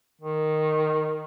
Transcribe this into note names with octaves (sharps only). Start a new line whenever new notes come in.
D#3